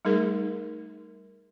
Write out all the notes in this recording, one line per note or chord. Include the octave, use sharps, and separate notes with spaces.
G3 A3 D#4 G#4 A#4